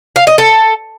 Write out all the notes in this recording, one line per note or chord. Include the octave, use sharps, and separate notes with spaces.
F5
D#5
A4